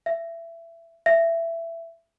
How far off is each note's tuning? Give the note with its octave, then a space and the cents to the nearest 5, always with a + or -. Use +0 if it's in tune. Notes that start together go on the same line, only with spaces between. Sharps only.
E5 +20
E5 +15